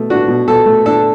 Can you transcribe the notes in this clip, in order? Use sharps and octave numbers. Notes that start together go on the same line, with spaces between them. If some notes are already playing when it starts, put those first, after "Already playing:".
Already playing: B2 A3
D4 F#4
B2
B2 A4
A3
D4 A4